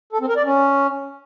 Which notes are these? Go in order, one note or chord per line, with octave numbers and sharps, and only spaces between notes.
A4
C4
A#4
D5
C#4